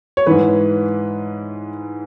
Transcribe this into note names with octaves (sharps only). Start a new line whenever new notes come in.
C#5
G#2 E3 B4